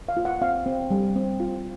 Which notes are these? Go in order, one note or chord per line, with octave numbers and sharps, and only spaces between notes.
F5
F4
F#5
C4 F5
C4
G3
C4
F4